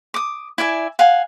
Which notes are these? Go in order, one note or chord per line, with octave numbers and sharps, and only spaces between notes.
D6 D#6
E4 D5 E5 G#5
F5 F#5 G#5